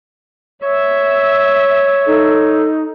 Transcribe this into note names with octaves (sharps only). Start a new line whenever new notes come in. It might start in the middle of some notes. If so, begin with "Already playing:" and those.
C#5 E5
D#4 A4